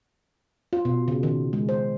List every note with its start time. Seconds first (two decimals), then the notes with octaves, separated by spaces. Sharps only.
0.73 F4
0.85 B2
1.08 C#3
1.23 D#3
1.53 G#3
1.69 C5